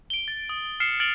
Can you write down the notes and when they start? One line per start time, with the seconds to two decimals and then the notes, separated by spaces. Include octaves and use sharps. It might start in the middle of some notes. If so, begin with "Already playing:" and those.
0.10 D7 G7
0.28 A6
0.49 D#6
0.80 F6 C7 C#7 E7
1.00 F6 A6 C#7 D7 F7 F#7